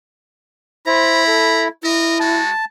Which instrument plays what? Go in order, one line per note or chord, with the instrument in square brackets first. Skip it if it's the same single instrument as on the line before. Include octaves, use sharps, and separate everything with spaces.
[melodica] E4 [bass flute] C5 [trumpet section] A#5 B5
[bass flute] A4
[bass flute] E4 [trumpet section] A#4 D#5
[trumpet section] G#3 F#4 [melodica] A5